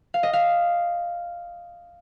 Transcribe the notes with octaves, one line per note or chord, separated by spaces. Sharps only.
F5
D#5
F5